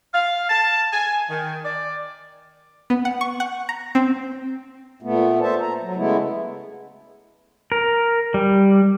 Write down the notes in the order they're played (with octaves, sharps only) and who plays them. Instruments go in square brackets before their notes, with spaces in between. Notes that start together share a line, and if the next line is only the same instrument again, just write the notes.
[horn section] F5
A5
G#5
D#3
D5
[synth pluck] B3
F#5
C#6
F#5
A#5
C4
[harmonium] A#2 A3 B3
A4 C5 E5 A5
A#5
F#3
C#3 G#3 A3 B3 E4
[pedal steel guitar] A#4
G3